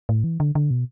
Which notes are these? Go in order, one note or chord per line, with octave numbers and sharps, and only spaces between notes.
A2
E3
D3
D3
B2